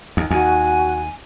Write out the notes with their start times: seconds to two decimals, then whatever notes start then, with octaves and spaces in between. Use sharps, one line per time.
0.17 D#2
0.31 D#2 F#4 G#5